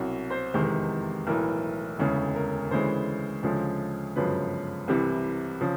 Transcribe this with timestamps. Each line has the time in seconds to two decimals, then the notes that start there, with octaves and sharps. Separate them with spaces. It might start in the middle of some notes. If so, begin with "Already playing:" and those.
Already playing: C2 B2 F#3
0.30 C5
0.54 F1 E2 C3 D#3 G#3
1.27 B1 A2 E3 A#4
1.99 E1 D2 C#3 E3 G#3 A4
2.35 A#4
2.71 D2 C#3 E3 G#3 C5
3.43 D2 C#3 F3 G#3
4.16 G1 F#2 C#3 F3 G#3 B4
4.88 C2 C3 E3 G3
5.61 C#3 F3